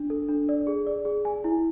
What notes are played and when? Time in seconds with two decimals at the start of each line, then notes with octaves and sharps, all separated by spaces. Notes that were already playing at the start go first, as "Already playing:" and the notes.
Already playing: D4
0.10 A4
0.29 D4
0.49 D5
0.67 G#4
0.87 D5
1.05 G#4
1.25 G#5
1.44 E4